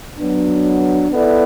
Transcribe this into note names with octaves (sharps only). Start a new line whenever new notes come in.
F#3 B3 D4
B3 E4 A4 D5